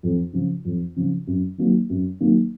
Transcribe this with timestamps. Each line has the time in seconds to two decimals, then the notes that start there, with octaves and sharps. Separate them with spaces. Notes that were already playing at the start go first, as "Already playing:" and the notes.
0.03 F2
0.33 C#3 F3
0.65 F2
0.96 C#3 F3
1.27 F#2
1.58 D#3 F#3 A#3
1.89 F#2
2.21 D#3 F#3 A#3